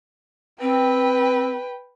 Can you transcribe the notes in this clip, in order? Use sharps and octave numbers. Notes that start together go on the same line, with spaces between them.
C4 B4 G5